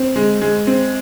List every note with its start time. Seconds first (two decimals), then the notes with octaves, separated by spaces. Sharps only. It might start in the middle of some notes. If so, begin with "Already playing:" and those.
Already playing: C4
0.16 G#3
0.42 G#3
0.67 C4